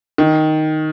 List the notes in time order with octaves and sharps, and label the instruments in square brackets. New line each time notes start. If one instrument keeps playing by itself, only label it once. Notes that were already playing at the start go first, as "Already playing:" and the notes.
[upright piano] D#3